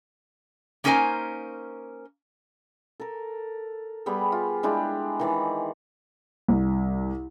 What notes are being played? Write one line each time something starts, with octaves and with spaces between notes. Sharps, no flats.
A#3 C#4 D#4 A#4 C5 G#5
A4 A#4
G3 B3 G4 G#4
F4
G#3 D4 E4 G4
D#3 E3 D5
C2